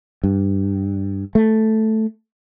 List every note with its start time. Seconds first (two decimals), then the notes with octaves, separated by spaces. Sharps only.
0.23 G2
1.35 A3